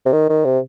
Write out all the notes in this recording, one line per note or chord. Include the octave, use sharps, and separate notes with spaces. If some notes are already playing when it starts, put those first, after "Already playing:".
C3
D#3
D#3
C3